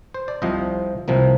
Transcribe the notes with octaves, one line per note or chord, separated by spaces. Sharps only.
C5
D5
C2 C3 F3 C5 D#5
C2 C3 F3 A#3